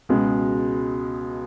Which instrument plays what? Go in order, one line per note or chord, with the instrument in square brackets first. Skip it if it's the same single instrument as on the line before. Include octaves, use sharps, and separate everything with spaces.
[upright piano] C#2 B2 G#3